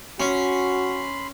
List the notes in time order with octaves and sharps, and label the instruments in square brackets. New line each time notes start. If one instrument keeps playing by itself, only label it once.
[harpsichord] C#4 [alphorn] F#4 [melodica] B5 C6